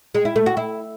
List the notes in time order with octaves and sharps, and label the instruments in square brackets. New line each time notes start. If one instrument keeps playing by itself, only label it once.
[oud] G#3
E4
A3
F#4
E4